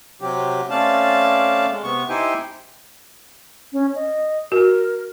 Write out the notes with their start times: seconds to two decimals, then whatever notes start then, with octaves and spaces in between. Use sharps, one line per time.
0.21 C3 F#3 G4
0.70 A3 C4 C#4 D5 F5 A5
1.69 G#3
1.83 C3 B3 C#6
2.09 D#4 E4 G4 C5 G5 G#5
3.73 C#4
3.95 D#5
4.52 F#4 A#4